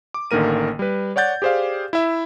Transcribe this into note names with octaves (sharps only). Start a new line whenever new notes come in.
D6
A1 D3 D#3 A#3 A#4 D#7
G3 B4
C#5 D5 F#5 G6 A6
G4 G#4 C5 D5 F5
E4 E5